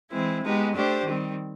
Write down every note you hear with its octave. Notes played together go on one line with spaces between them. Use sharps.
E3 G#3 C4 E4
G#3 B3 D#4 G4
A3 D4 G4 C5
D#3 G3 C4